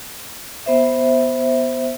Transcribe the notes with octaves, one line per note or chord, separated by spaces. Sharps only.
B3 C5 E5